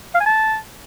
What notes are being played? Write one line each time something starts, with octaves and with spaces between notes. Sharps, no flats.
F5
G#5
A5